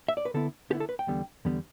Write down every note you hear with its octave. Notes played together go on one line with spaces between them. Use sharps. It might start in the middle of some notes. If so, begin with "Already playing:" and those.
E5
D5
B4
D3 B3 E4 A4
D3 B3 E4 G4
A4
B4
G5
E2 D3 G3 B3
E2 D3 G3 B3